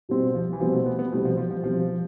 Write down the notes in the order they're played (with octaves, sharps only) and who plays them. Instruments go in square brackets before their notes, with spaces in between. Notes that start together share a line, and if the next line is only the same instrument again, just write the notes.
[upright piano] B2 G3 C4
[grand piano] F3
E3
[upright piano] B2 G3 C4 [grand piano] F3
[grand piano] A3
B3
B3
[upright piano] B2 G3 C4 [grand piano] A3
[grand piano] F3
F3
F3
[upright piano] B2 G3 C4 [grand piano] F3